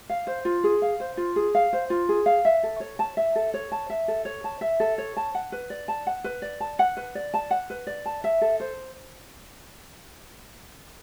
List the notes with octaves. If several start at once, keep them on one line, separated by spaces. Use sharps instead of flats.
F5
C5
F4
G#4
F5
C5
F4
G#4
F5
C5
F4
G#4
F5
E5
A4
C#5
A5
E5
A4
C#5
A5
E5
A4
C#5
A5
E5
A4
C#5
A5
F#5
B4
D5
A5
F#5
B4
D5
A5
F#5
B4
D5
A5
F#5
B4
D5
A5
E5
A4
C5